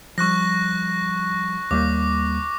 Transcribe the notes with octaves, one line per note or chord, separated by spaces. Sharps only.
F3 G3 C#6 F#6 A#6
D#2 G3 A#3 D6